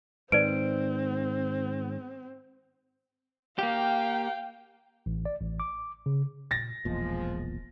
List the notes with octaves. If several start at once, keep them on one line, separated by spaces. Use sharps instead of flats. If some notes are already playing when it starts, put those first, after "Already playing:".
G#2 D#3 C4 B4 C5 D5 D7
A#3 G4 F5 G5
A1
D5
A1
D6
C#3
A#2 A6 A#6
E1 B1 E2 A#2 F3 G#3